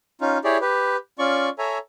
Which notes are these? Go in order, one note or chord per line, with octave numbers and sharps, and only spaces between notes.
C#4 D#4 F4
E4 G4 G#4 C#5 D5
G4 B4
C#4 F4 D5 C#6
A4 C#5 E5 G#5 A#5